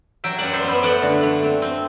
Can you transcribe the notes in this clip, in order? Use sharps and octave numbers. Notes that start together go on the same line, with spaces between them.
F#3 E5 G5
F#2 D5 F#5
C5 E5
B3 C5 E5
A3 D5 F#5
D3
A3
C4
C4